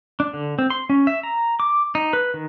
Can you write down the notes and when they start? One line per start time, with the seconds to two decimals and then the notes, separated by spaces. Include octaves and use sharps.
0.20 D4
0.33 D3
0.59 C4
0.70 C6
0.90 C#4
1.07 E5
1.23 A#5
1.60 D6
1.95 D#4
2.13 B4
2.34 D#3